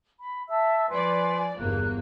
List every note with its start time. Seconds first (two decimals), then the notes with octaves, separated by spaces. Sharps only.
0.19 B5
0.49 E5 A5 E6
0.89 F3 B4 D5 G#5 C6
1.59 G1 E2 A#3 F#6